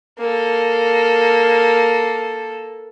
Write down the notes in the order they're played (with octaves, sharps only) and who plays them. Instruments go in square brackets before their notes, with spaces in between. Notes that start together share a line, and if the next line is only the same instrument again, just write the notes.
[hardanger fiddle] A#3 A4